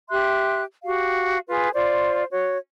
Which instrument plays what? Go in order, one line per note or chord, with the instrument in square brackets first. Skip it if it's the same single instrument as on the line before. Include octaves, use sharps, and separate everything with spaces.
[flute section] G4 E5 C6 F#6
F#4 G4 F5
F4 G#4 B4
F4 C5 D5
F#4 C#5